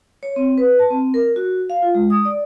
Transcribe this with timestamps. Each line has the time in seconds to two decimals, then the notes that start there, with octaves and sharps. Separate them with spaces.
0.23 C#5
0.36 C4
0.58 B4
0.79 A5
0.90 C4
1.14 A#4
1.36 F#4
1.70 F5
1.82 F4
1.95 G#3
2.10 D#6
2.25 D5